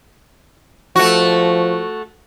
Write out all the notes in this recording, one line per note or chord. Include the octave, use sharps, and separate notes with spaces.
F3 A3 F#4